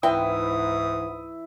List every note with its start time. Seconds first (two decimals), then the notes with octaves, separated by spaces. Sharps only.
0.03 C#2 G#2 E3 B3 C4 E4 G5 D#6